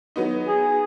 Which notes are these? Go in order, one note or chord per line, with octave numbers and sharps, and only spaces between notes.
F#3 B3 D#4
G#4